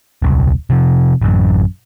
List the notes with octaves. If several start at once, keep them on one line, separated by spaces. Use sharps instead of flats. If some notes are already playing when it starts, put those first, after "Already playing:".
D#1 C2
C3 F3
A1 F#2